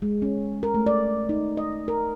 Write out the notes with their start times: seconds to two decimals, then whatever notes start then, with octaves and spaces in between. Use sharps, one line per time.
0.02 G#3
0.22 C#4
0.63 A#4
0.74 A3
0.86 D5
1.29 D#4
1.57 D#5
1.88 A#4